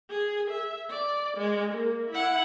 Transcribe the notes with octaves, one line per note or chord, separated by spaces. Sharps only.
G#4
E5
D5
G#3
A#3
E4 F#5